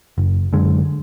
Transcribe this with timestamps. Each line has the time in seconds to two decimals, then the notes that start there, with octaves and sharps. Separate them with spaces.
0.18 F#1
0.53 F#2 D3 G#3